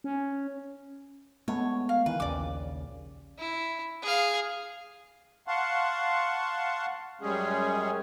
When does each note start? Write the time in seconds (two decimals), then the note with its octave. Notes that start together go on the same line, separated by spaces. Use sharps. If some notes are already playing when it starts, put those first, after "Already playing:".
0.04 C#4
1.48 G#3 A3 B3 C#5
1.89 F5
2.06 D#3 E3 B4
2.20 A#1 D#2 C#3 D5 D6
3.38 E4
4.02 G#4 F5
5.47 F5 F#5 A5 C6 C#6
7.22 F#2 G3 G#3 C#4 G#4